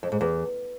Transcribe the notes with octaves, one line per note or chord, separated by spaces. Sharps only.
F2
G#2
E2